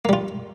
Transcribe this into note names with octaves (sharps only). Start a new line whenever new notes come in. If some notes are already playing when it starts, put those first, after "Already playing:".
G3 A#3 F4